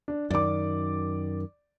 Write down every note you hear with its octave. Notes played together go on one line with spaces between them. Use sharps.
D4
F#2 D#3 D5 D6